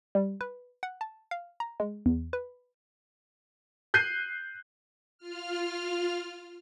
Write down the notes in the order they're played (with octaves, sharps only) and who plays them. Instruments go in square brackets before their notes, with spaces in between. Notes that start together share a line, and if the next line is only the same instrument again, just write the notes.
[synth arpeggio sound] G3
B4
F#5
A5
F5
A#5
G#3
E2
B4
[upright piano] F#6 G6 C7 D#7
[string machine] F4 F6